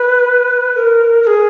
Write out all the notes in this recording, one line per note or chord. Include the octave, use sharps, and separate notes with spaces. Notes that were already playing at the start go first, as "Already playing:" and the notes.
Already playing: B4
A#4
A#4
G#4